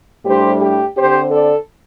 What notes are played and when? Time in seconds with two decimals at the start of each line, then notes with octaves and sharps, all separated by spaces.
0.25 A2 G3 D4 G4 C5
0.61 G4
0.95 C4 G4 C5
1.01 D3
1.30 A4 D5